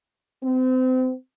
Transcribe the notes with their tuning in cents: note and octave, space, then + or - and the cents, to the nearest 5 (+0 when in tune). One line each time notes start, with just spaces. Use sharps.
C4 -30